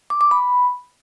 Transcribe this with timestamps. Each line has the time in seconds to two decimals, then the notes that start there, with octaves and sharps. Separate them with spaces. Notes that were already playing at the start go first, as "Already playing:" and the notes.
0.10 D6
0.21 D6
0.31 B5